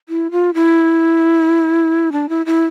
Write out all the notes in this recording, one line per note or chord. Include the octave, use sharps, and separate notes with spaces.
E4
F4
E4
D4
E4
E4